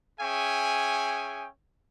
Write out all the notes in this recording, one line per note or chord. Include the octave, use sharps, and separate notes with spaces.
C#4 G#4 E5 G5 G#5 C#6